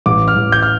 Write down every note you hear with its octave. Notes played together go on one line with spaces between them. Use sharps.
A1 D6
F6
A1
G6
F6